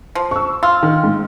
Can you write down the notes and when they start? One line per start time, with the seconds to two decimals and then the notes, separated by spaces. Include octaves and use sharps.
0.15 F3
0.31 C#6 E6
0.63 F4 E6
0.83 D#3
1.04 G#2